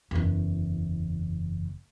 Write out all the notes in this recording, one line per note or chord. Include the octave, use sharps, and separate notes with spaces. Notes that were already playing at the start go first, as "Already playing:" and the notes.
F#1 E2